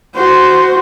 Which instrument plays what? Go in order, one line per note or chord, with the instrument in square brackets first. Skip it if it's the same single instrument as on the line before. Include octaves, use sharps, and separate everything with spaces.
[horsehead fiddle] F#4 C5